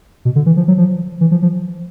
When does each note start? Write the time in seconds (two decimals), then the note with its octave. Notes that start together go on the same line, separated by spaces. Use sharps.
0.25 B2
0.36 D3
0.46 E3
0.57 F3
0.68 F#3
0.78 F3
1.21 E3
1.31 F3
1.42 F3